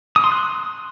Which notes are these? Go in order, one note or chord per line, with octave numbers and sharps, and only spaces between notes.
D#6
C6
F#6